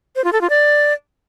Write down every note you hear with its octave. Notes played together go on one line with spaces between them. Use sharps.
C5
F4
A4
F4
D5